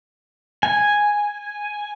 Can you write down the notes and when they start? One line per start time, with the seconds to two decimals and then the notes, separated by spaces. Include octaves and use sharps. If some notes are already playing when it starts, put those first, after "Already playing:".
0.63 G#5